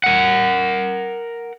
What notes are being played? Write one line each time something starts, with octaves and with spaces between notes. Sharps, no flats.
A#4 F#5